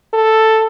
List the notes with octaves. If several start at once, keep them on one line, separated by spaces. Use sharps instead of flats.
A4